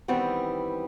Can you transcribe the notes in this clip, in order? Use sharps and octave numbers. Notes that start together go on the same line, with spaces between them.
D#3 E3 G3 B3 C4